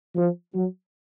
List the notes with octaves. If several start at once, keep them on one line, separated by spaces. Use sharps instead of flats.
F3
F#3